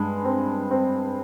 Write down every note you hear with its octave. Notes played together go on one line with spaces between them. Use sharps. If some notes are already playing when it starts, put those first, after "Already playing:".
Already playing: G2 G#3
C4
C4